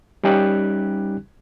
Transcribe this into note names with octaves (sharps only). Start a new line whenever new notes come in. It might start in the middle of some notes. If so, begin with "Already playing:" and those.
G3 C#4 D#4 G4 F#6